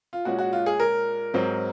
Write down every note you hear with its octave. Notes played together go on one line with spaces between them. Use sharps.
F4
A#2 G#3 C#4 F#4
F#4
F4
G#4
A#4
G#2 F#3 C4